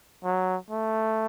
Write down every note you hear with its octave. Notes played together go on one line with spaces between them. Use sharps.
F#3
A3